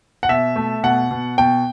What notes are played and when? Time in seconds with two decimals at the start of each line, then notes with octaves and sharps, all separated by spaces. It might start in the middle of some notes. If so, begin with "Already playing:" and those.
0.23 F#5
0.29 B2 E5
0.56 A3
0.83 B2 F#5
1.11 B2
1.38 B2 G5